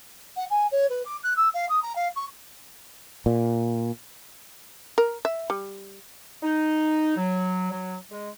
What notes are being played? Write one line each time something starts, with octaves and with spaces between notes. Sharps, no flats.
F#5
G#5
C#5
B4
D6
F#6
E6
F5
D#6
A#5
F5
C#6
A#2
A#4
E5
G3
D#4
F#3
F#3
G#3